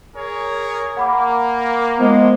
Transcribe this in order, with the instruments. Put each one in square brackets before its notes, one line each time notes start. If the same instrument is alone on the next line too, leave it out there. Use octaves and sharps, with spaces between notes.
[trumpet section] G#4 A#4 C#5
[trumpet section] A#3 [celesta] F#5 B5 D6
[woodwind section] F3 G#3 B3